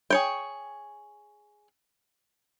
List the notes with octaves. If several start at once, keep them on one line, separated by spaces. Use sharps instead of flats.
G#4 C#5 G5